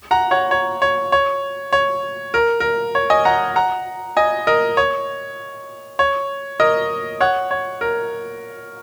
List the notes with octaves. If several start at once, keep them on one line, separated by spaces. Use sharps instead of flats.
F#5 A#5
C#5 F#5
C#5
C#5
C#5
C#5
A#4
A#4
C#5
D#5 G#5
F#5 A#5
F#5 A#5
D#5 G#5
A#4 D#5
C#5
C#5
A#4 D#5
C#5 F#5
C#5
A#4